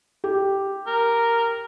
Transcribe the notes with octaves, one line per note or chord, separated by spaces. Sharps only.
G4
A#4